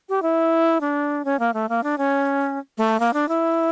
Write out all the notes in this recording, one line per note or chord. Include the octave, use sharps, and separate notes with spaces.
G4
E4
D4
C#4
A#3
A3
A#3
D4
C#4
A3
A#3
D4
E4